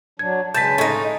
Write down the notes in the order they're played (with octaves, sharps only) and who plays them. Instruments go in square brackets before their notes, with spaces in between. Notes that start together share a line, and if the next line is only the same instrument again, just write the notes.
[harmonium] F#3 D4 [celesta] G#6
[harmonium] C#3 G#3 [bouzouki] B4 A5 [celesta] G6 A6 B6
[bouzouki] A2 D#4